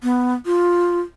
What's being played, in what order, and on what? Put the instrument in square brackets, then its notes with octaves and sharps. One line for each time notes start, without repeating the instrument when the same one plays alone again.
[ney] B3
F4